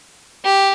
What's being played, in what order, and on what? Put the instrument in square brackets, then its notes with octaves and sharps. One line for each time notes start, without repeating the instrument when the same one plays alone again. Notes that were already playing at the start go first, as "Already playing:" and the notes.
[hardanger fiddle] G4